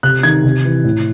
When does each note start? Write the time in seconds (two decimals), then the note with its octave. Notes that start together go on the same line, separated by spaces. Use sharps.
0.03 C3 F#6
0.23 D#3 G#6
0.44 C3
0.65 E3
0.84 A2